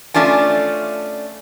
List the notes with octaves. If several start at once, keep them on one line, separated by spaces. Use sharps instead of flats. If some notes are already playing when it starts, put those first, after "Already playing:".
A3 C#4 D4 F4 G#5